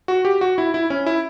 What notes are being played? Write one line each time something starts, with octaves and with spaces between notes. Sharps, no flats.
F#4
G4
F#4
E4
E4
C#4
E4